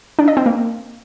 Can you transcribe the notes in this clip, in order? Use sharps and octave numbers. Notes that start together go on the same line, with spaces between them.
D4
D#5
C4
A#3